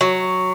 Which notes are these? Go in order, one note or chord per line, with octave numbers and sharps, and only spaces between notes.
F#3